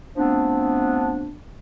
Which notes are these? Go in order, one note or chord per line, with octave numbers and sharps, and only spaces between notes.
F3 A3 B3 C4 D4